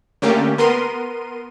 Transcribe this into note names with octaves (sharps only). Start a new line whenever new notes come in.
D3 A3 A#3 C#4 G4
B3 A#4 C6 D#7